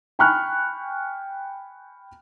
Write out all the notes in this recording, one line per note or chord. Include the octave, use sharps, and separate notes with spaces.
G5 G#5 B5 C#6 F6 F#6